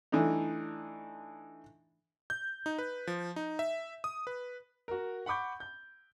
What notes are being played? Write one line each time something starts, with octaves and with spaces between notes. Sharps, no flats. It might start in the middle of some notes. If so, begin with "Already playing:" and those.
E3 A3 D4 D#4
G6
D#4
B4
F3
D#4
E5
D#6
B4
F#4 A#4
F#5 B5 C#6 D6 G6
G6